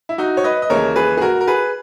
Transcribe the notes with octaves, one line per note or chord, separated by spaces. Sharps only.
E4
D#4 F#4
C#5
B4 D#5
D#5
D#2 C#3 E3 G#3 A#4 C#5
G#4 B4
G#4
F#4 A#4
A#4
G#4 B4